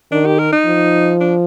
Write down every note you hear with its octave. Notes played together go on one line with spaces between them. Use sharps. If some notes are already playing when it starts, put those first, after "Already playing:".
D#3 D4
G4
A#4
D#4
F3
D4